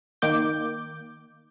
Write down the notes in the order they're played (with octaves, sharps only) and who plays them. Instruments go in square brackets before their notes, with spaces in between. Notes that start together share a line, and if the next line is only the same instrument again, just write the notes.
[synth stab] D#3 A#3 D6 G6